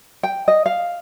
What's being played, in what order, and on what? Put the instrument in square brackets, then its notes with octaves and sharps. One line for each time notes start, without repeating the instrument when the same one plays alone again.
[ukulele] G5
D#5
F5